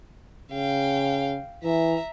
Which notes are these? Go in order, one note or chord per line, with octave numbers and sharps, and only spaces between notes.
C#3 F5 G5
E3 E5 A#5